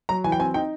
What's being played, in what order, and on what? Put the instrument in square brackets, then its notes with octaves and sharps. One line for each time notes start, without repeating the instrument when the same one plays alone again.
[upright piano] F#3 A#5
E3 G#5
G5
C4 G#5
D#4 G5